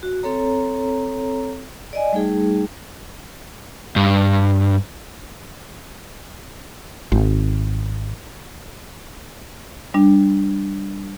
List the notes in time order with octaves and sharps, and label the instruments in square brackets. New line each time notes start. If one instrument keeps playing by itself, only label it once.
[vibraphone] F#4
C4 A4 C#5 A#5
D5 D#5 G#5
G3 A3 D#4 G#4
[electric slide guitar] G2
[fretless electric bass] G#1
[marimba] G3 D4